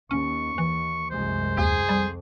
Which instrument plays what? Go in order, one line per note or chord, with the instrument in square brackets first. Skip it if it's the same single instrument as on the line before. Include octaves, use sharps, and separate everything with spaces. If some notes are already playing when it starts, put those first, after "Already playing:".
[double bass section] D#2 [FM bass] C#4 [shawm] C#6
[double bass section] D#2 [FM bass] E3
[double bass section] C2 F#2 G#3 [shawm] C5
[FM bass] D#2 [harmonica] G#4
[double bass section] F2 [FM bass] G3